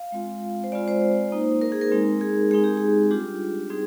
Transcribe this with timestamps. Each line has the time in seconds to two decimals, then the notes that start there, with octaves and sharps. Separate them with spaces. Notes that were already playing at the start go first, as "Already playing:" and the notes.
Already playing: F5
0.12 G#3 C4 F4
0.64 C5
0.72 G#3 C4 F4 D5
0.88 C5
1.02 C5
1.32 A#3 D#4
1.61 A#4
1.72 G#4
1.81 A#4
1.92 G#3 C4 D#4
2.21 G#4
2.51 G#3 C4 D#4 G#4
2.64 G4
2.77 G#4
3.11 G3 D4 F4 G4
3.70 G3 C4 D#4 G#4